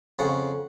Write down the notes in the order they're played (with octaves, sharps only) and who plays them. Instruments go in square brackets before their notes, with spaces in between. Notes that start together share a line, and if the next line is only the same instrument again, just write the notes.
[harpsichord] F2 C#3 F#5